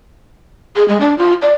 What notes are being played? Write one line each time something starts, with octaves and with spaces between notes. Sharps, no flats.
G#4
G#3
D4
F4
D5